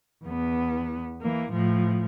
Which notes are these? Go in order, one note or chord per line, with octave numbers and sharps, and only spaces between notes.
E2 B3
E3 A#3
A2 F3